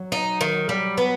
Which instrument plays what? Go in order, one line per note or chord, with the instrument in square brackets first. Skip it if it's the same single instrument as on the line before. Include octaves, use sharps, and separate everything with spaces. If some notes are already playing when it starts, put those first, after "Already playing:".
Already playing: [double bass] F#3
[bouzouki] D#4
D#3
G3
B3